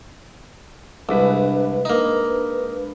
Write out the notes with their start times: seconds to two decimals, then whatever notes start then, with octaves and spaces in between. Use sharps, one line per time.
1.09 C2 G#3 D4 B4
1.85 A#3 D#4